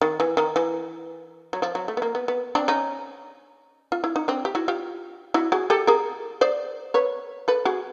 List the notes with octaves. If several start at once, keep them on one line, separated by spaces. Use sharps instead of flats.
D#3
E3
D#3
E3
F#3
F3
F#3
A3
B3
A#3
B3
B3
C4 D4
C#4 D#4
F4
E4
D#4
C4 D4
G4
E4 F#4
F4 G4
E4 F#4
F#4 G#4
G4 A4
G#4 A#4
C5 D5
B4 C#5
A4 B4
F#4 G#4